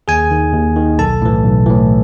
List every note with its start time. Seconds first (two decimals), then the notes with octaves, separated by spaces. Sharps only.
0.08 D#2 G#4 G#5
0.31 D#3
0.53 D#2
0.76 D#3
0.98 B1 A4 A5
1.22 A2 E3
1.44 B1
1.66 A2 E3